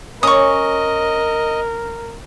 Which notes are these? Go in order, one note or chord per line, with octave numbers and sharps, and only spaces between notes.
C#4 A#4 D#5 C#6 D#6